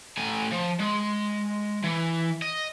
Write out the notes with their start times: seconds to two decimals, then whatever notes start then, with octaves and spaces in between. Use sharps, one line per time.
0.17 A2 G#5
0.52 F3
0.79 G#3
1.84 E3
2.42 D#5